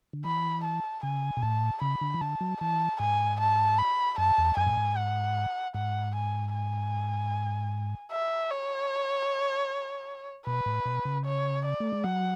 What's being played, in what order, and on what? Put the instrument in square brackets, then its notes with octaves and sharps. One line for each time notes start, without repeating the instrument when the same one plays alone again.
[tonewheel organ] D3
[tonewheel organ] E3 [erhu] B5
[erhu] A5
[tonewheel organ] C#3 [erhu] G#5
[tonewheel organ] B2
[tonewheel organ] A2 [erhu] A5
[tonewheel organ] C#3 [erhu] B5
[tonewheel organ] D3
E3
[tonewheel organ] D3 [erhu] A5
[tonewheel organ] F#3
[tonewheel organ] E3 [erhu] A5
[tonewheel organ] G#2 [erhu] G#5
[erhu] A5
B5
[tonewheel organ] F#2 [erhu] A5
[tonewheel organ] E2
[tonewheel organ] F#2 [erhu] G#5
[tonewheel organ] A2
G#2
[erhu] F#5
[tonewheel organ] G#2 [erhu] F#5
[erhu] G#5
G#5
E5
C#5
[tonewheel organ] B2 [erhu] B4
[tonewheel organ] A2
B2
C#3
[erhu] C#5
D5
[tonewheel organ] A3
G#3
[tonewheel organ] F#3 [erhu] F#5